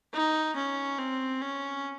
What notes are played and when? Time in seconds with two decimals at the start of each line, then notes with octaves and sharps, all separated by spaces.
0.13 D#4
0.56 C#4
0.98 C4
1.41 C#4